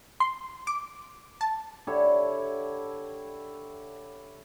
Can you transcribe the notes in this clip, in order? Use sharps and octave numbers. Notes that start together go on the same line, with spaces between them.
C6
D6
A5
D3 E4 G4 C#5